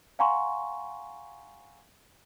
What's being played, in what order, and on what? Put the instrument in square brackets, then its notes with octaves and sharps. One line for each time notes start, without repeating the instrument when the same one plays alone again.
[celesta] F5 F#5 G#5 A#5 C6 C#6